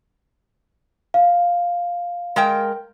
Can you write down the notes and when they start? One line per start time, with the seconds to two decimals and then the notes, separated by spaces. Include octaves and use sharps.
1.14 F5
2.36 G#3 A#4 G5